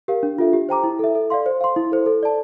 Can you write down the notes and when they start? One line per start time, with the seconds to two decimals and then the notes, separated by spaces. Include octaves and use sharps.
0.08 G4 A#4 F5
0.23 D4
0.38 F4 A4 E5
0.53 G4
0.69 C5 G5 A#5 D6
0.84 E4
0.99 A4 E5
1.15 A4
1.30 D5 F5 C6
1.46 C5
1.61 F5 C6
1.76 E4
1.92 A4 C5
2.06 A4
2.23 D5 A5